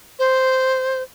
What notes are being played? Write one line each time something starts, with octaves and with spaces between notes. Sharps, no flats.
C5